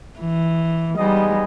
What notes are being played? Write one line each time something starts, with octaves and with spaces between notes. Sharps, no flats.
E3
G3 G#3 B3 D#4 G#4 D#5